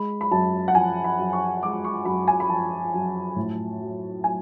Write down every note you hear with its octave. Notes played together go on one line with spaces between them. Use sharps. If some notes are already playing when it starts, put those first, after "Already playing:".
Already playing: G#3 B5
B5
F#2 A5
F#5
F3 G#5
B5
F#2
C#6
G#3 D6
C#6
F#2 B5
G#5
B5
F3 A5
F#2
A2
F#3
F#3 G#5